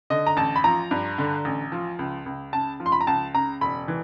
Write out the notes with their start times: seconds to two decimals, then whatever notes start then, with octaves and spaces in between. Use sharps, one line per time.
0.10 D3 D#5
0.27 A#5
0.37 A1 A5
0.56 B5
0.64 F3 A#5
0.91 G2
1.18 D3
1.45 A1
1.72 F3
1.99 C#2
2.26 C#2
2.53 C#3 A5
2.80 F3
2.86 C6
2.92 B5
3.01 A#5
3.07 C#2 A5
3.34 C#3 A#5
3.61 E1 B5
3.88 E3